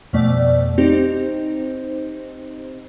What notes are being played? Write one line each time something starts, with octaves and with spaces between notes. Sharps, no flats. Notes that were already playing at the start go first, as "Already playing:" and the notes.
F2 B2 A3 D5
C4 D#4 G4 C5